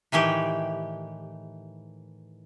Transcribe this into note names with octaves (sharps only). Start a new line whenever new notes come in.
A2 D#3 E3 G4